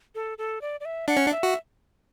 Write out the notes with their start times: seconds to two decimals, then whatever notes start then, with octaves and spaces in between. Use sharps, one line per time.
0.15 A4
0.38 A4
0.61 D5
0.80 D5
0.85 E5
1.08 D4 F#5
1.17 C#4
1.26 D4
1.32 E5
1.43 F#4